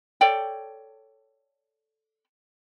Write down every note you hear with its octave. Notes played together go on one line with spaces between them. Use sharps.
A4 C#5 D5 G5